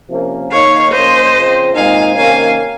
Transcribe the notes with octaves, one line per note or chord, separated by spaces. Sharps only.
C3 F3 A#3 C#4
D#3 A#3 D#4 C#5 F5
F3 A#3 C#4 C5 D#5
C#3 F3 C4
A#2 G#3 C4 D#4 F5 G#5
C3 D#3 A#3 C#4 F5 G#5